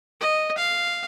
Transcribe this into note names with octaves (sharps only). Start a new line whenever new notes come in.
D#5
F5